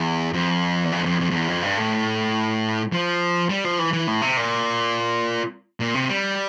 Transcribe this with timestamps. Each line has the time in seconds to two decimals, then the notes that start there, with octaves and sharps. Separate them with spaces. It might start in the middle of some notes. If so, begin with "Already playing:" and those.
Already playing: E2
0.33 F2
0.84 E2
0.92 F2
1.05 F2
1.20 F2
1.31 F2
1.34 E2
1.48 F2
1.63 G2
1.77 A2
2.93 F3
3.50 G3
3.65 F3
3.79 E3
3.93 E3
4.07 A2
4.22 C3
4.37 A#2
5.80 A#2
5.95 C3
6.09 G3